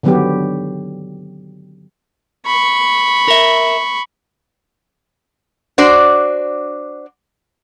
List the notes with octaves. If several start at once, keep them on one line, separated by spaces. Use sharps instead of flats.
D3 D#3 F#3 B3 D4 G4
B5 C#6
A#4 E5
D4 F#4 C5 D5